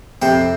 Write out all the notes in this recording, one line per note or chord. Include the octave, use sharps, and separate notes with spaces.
F2 C3 C4